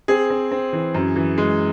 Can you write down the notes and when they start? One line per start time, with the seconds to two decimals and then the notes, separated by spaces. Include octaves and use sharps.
0.08 C4 G#4
0.30 C4
0.51 C4
0.73 E3
0.94 F#2
1.16 E3
1.38 G#3